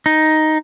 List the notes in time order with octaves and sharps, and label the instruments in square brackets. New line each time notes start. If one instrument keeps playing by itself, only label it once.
[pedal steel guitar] D#4